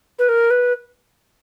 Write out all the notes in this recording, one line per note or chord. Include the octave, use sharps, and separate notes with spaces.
B4
A#4
B4